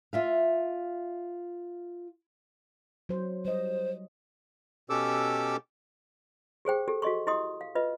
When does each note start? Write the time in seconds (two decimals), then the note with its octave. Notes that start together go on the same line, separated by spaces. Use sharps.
0.13 F4 E5 F5
3.09 F#3 C5
3.45 G3 C5 D#5
4.90 B2 C#4 G4 A4 D6 E6
6.65 G4 G#4 C5 G5
6.88 G4 A4
7.02 F#4 A4 D#5 C6 C#6
7.27 E4 G4 D#5 C6 D#6
7.61 F5
7.75 F4 B4 D#5